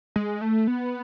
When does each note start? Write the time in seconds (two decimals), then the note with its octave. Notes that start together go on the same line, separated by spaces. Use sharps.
0.16 G#3
0.41 A3
0.67 B3